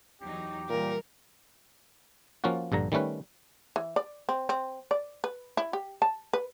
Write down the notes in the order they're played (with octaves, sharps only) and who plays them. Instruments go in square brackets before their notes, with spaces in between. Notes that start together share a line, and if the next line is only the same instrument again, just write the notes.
[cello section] E2 F#3 D#4 [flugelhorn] G4
[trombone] A#2 [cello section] E3 G3 [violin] A#4
[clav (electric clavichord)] F3 A#3 C#4 F4 F#4
A#1 G2 D3 A#5
D#3 G3 A3 C#4 B4
[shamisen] E3
D5
C4
C4
D5
B4
E4
G4
A5
B4